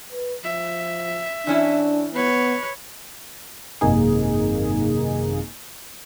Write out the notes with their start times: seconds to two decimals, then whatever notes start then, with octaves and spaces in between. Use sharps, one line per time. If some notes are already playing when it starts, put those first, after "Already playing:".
0.12 B4
0.44 F3 E5
1.47 E3 C#4 D4 E4
2.15 B3 B4 C#5
3.81 G#1 F#2 C3 A#3 D#4 G#4